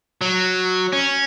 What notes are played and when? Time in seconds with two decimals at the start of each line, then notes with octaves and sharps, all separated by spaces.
0.21 F#3
0.93 C#4